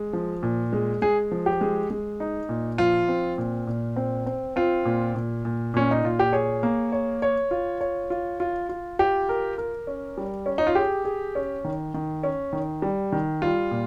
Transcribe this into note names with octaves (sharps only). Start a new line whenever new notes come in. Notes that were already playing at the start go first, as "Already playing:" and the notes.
Already playing: G#3
F3
A#2
G#3
G#3 G#4
F3
G4
G#3
G#3
D#4
A#2
F3 F4
C4
A#2
A#2
C4
C4
C4 F4
A#2
A#2
A#2
A#2 C#4
D#4
A#2 F4
G4
G#4 C#5
A#3
C#5
C#5
F4
C#5
F4
F4
F4
F4 G4
A#4
A#4
C#4
G3
C#4
D#4
F4
G4 G#4
G#4
C#4
D#3
D#3
C#4
D#3
G3
D#3
G3 F4
A#2